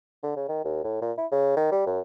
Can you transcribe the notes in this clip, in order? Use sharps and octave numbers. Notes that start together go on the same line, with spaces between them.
D3
C#3
D#3
D#2
A2
A#2
E4
C#3
D#3
G3
F#2